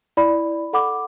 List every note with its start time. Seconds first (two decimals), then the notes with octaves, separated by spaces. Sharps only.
0.17 E4 D5 B5
0.73 A4 F#5 B5 D6